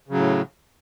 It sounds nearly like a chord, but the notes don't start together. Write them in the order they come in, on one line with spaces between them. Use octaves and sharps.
C#3 F#3 A2